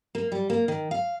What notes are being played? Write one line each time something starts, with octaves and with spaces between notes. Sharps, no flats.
A#3
G3
A#3
D#3
F5